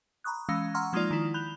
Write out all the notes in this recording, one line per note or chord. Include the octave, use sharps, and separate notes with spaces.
A#5 B5 C#6 D#6 F#6
E3 G#3 C#4 F5 E6 A#6
F#5 A#5 C6 C#6 E6 F6
F3 G#3 A#3 D#4 F4 D5
D#3 E4
B5 F#6 G6 F7 G7